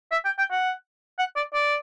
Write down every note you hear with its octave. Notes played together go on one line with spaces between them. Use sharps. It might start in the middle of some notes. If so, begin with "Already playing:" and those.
E5
G5
G5
F#5
F#5
D5
D5